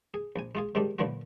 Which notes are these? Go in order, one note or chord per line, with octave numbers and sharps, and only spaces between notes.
G#4
A#1 G#5
G#3 F4 G#4
G#2 D#3 G3 G#3 D4
F#2 A#2 D3 E3 F3 F#4